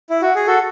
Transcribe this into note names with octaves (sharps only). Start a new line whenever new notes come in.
E4
F#4
G#4
F#4 A4